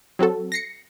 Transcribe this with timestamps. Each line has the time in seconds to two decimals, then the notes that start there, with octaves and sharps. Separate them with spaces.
0.19 F#3 C4 F#4 A4
0.52 A#6 C7 C#7